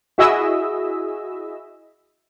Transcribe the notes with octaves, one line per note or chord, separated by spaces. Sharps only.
E4 F#4 G#4 D#5 E5 E6